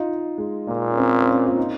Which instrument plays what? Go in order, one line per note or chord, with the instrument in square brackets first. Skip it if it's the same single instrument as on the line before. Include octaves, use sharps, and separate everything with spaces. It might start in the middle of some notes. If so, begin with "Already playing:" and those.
Already playing: [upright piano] D#4 F4
G#3
[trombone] A#2 [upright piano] A#3
[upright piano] C#4
C4
C4
C#4
F4
D#4